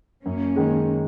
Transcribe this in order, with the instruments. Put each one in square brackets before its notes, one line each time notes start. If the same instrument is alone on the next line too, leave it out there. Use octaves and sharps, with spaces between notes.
[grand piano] F#2 [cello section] A#3 C#4
[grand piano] D#3 G#3